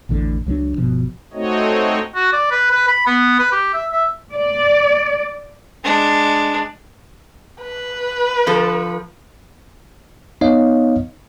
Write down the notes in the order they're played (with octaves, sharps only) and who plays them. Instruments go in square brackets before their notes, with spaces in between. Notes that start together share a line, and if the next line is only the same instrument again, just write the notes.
[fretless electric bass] A1 E2 A2 D3
C#2 F#3 G3 D4
G1 B2 F3
[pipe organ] A3 C4 D#4 F#4 C#5 D#5
[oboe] F#4
D5
B4
B4
B5
B3
B4
G4
E5
E5
[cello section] D5
[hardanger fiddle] G#3 D4
[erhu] B4
[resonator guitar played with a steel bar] D3 F3 A4
[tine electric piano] B3 D#4 C#5 D#5 F5